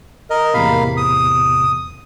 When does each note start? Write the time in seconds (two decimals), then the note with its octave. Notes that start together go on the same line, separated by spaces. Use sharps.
0.30 A#4 D#5
0.54 E2 A2 C3 A#3 F5 B5
0.97 D#6